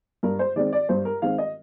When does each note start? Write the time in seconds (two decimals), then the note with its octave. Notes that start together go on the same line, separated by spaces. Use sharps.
0.23 G2 A#4
0.39 C5
0.56 D#3 G#3 C4 D5
0.73 D5
0.89 G2 C5
1.05 A#4
1.22 D#3 G#3 C4 F5
1.38 D#5